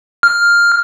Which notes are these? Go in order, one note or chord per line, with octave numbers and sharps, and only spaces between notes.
F6